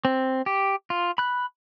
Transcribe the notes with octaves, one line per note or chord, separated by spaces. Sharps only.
C4
G4
F4
B5 F#6